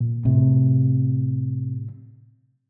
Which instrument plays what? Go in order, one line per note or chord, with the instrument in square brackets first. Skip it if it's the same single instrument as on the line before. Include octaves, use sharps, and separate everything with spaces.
[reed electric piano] A#2
[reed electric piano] A2 [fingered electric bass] C3